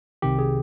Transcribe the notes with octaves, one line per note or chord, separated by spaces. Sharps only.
C2 C3 D#3 G4
G#4